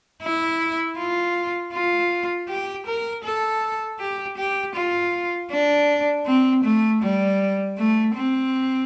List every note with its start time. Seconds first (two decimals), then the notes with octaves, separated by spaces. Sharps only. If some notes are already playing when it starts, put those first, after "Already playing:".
0.22 E4
0.98 F4
1.73 F4
2.49 G4
2.86 A#4
3.24 A4
4.00 G4
4.37 G4
4.75 F4
5.51 D4
6.26 C4
6.64 A3
7.02 G3
7.77 A3
8.15 C4